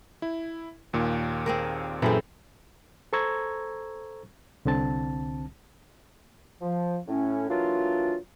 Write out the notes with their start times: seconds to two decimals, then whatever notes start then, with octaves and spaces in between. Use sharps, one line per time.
0.22 E4
0.93 D#2 A#2
1.46 C4 G#4 A#4
2.02 F#2 A#2 E3 C4 G#4 A4
3.13 A4 C5 A#5 C#6 E6 G#6
4.65 C2 D3 C4 A5
6.61 F3
7.08 A2 C#4
7.49 E3 F#3 A#3 D4 F4